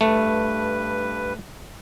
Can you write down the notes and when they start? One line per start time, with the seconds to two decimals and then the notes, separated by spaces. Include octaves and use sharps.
0.01 G2 A3 B4